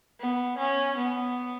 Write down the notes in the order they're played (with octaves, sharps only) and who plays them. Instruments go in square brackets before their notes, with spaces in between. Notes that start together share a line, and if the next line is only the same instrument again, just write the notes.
[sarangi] B3
C#4
B3